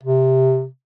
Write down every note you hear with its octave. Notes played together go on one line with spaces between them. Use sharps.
C3